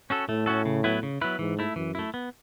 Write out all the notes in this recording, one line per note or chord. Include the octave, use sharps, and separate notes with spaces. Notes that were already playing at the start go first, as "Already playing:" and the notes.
C#4 F#4 A4
A2 A3
C#4 F#4 A4
C#3
F#3 B3 E4 B4
C#3
F#3 B3 E4 B4
G#2 E3
A3 E4
F#2 E3
A3 E4
B3